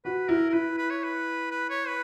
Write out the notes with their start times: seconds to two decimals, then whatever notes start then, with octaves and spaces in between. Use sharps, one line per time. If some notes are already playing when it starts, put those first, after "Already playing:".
0.05 F#4 B4
0.29 E4 A#4
0.50 A#4
0.53 E4 B4
0.78 B4
0.90 C#5
1.03 B4
1.51 B4
1.70 C#5
1.87 B4